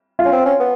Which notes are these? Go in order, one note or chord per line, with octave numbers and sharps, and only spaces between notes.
F4
C#4
C4
C#4
B3